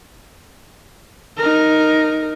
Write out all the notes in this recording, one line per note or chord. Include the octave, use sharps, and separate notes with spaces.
D#4 A#4